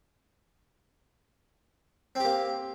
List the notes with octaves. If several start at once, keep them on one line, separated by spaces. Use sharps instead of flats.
A#3 C4 G4